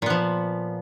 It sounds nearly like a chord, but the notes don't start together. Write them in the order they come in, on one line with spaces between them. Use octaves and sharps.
A#2 B3 F3